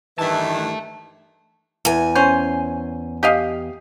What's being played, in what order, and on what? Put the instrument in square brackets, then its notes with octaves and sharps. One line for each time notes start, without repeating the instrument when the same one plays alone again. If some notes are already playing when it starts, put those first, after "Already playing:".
[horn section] G2 D#3 E3 [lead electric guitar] E5 A5
[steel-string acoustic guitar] E2 G#5
[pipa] C#4 C5
G4 D#5 F5